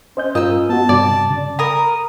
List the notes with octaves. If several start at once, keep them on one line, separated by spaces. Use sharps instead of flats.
C#4 C5 D#5 G6
G2 F4 A#4 D#5 E6
B3 F#4 A5
G2 C3 D5 D6
C#3
A#4 A#5 B5 D#6